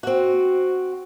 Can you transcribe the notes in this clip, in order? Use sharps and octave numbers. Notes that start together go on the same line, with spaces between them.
C4 F#4